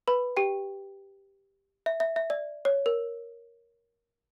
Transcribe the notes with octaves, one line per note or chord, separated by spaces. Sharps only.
B4 B5
G4 G5
E5
E5
E5
D5
C#5
A#4